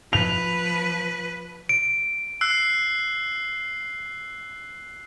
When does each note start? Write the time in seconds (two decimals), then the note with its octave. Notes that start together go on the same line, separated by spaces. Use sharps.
0.13 F3 B4 F7
1.69 D7
2.41 E6 F#6 C7